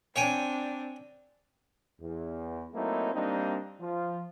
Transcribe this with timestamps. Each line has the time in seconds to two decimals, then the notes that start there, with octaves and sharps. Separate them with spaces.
0.16 C4 D4 C#5 G5 G#5
2.00 E2
2.74 F#3 A3 A#3 C4 D#4 E4
3.14 G3 A#3 C4 D4 D#4
3.80 F3 F4